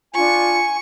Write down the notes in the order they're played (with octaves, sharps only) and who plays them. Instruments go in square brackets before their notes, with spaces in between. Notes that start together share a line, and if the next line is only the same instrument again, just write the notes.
[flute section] D4 F4 [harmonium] G#5 [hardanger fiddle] C#6